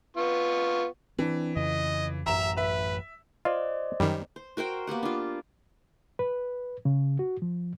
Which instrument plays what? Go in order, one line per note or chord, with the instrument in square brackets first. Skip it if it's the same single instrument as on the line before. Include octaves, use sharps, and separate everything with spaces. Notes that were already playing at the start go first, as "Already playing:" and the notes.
[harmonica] B3 F4 C#6
[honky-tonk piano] E3 [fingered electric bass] C4 D4
[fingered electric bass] F2 C#3 [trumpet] D#5
[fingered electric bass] A1 F#2 [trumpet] E5 [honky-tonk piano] A#5 E7
[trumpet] B4 [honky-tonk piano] E5
[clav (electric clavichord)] F4 [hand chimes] C5 D5 D#5
[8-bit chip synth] F#2 D#3 [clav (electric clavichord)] G3
[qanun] C5
F#4 A#4 C5 G5
A#3 B3 G4 F#5
D4 F4
[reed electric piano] B4
C#3
F#4
F3